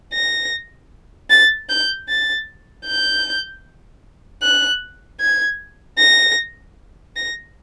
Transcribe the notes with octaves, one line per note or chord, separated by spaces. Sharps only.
A#6
A6
G6
A6
G6
F#6
G#6
A#6
A#6